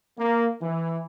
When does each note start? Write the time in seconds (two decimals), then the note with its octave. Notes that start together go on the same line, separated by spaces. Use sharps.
0.18 A#3
0.60 E3